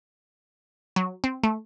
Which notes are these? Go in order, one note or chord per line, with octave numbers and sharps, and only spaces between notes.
F#3
C4
A3